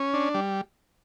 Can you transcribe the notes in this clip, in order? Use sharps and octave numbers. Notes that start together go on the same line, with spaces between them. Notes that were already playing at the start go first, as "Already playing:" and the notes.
Already playing: C#4
D4
G3